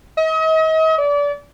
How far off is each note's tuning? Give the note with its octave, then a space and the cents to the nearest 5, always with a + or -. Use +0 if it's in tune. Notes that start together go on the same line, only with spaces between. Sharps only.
D#5 +40
D5 -30